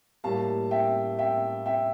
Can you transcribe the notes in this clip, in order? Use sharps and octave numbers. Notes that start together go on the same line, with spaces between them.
A2 G3 A#3 F5 A5
E5 G5
E5 G5
E5 G5